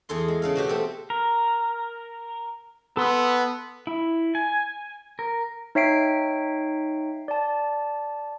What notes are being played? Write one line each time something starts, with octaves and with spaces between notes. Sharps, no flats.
E2 G#4 A4 C6
G#3
C#3 A4 F5
B2 F#4 G4
A3 C4 A4
A#4
B3 A4 C6 E6
E4
G#5
A#4
D#4 C#5 E5 G5 C7 D7
D5 A5